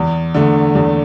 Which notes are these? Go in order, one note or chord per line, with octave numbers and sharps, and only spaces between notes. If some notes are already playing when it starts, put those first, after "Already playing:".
Already playing: E2
D3 A3
E2